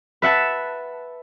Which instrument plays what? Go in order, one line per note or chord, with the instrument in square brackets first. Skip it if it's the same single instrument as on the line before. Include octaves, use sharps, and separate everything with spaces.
[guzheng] B4 E5 F#5 A5